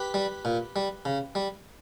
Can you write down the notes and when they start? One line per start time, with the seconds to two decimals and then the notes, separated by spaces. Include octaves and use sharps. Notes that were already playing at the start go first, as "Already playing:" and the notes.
Already playing: G4 B4
0.14 G3
0.45 A#2
0.76 G3
1.05 C#3
1.35 G3